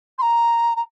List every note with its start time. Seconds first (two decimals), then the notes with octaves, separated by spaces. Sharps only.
0.18 C6
0.22 A#5
0.76 A#5